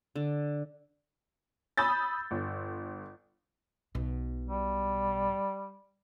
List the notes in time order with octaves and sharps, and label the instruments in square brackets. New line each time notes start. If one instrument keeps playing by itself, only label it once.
[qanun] D3
[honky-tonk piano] B5 D#6 E6 G6 A6
G1
[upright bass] B1 B2
[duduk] G3